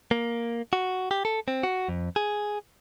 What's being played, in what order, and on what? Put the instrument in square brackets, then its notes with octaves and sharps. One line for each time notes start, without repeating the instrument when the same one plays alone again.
[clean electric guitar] A#3
F#4
G4
A4
C4
F#4
F2
G#4